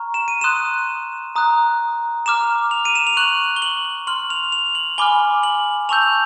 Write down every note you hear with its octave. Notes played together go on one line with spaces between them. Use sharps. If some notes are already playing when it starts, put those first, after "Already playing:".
Already playing: A#5 C#6 F6
E7
D#7
C6 D#6 F#6 E7
A#5 D#6 F#6
A#5 D6 F6 E7
F7
D#7
E7
F7
C#6 F#6 F#7
G7
F#7
C6 F6 F#7
F7
F7
F#7
G#5 B5 D6 F6 G7
F#7
A5 C#6 E6 G6 F7